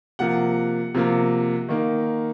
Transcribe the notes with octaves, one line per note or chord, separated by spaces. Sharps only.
C3 F3 A#3 F#5
C3 F3 A#3
D#3 A#3